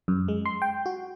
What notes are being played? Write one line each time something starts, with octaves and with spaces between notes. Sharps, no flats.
F#2
G#3
C6
G5
F#4